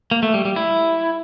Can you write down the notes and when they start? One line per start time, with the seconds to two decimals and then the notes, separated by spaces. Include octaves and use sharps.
0.11 A#3
0.23 A3
0.34 G3
0.45 G3
0.56 E4